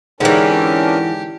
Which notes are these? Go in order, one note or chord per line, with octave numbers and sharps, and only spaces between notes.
G#2 D3 E3 C#4 D4 G4 A#4